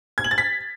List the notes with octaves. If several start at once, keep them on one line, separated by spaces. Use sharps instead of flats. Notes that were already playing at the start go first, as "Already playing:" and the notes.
G#6
F#7
A6
B6